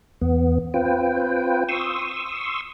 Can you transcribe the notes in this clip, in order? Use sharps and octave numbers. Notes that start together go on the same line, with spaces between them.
E2 B3
C4 F4 B4 G5
C6 C#6 D#6 E6